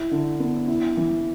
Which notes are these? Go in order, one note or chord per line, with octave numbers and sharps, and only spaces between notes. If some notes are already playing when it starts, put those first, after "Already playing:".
Already playing: E4
D3
B3
E4
E3